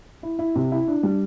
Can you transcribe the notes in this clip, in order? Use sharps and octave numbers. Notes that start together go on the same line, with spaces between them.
E4
E4
C3
E4
D4
G3